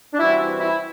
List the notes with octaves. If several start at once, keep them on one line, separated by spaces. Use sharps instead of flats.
D4
C3 E3 G3 C4 E4 F#4
E4